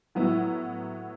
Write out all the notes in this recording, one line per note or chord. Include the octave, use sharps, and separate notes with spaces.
A2 F#3 B3 E4